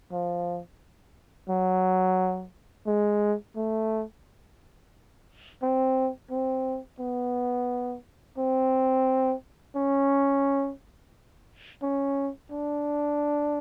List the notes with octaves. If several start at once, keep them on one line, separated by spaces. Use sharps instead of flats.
F3
F#3
G#3
A3
C4
C4
B3
C4
C#4
C#4
D4